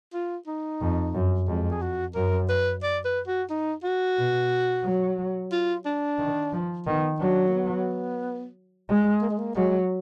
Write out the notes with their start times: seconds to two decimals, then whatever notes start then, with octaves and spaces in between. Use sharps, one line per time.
0.13 F4
0.47 D#4
0.81 F2
1.15 F#2
1.48 F2 G#3
1.71 G#4
1.82 F#4
2.15 F#2 A#4
2.49 B4
2.83 D5
3.05 B4
3.27 F#4
3.50 D#4
3.84 F#4
4.17 B2
4.85 F#3
5.52 F4
5.86 D4
6.19 D#3
6.53 F3
6.86 D#3 B3
7.20 F#3 D4
7.48 A#3
7.54 B3
8.89 G#3
9.22 A#3
9.30 G#3
9.38 A#3
9.55 F#3 G#3